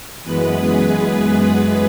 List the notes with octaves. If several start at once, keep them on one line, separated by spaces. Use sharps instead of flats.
F#2 E3 G#3 B3 B4
G#4
G#4